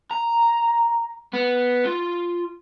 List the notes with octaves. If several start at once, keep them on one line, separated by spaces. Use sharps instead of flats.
A#5
B3
F4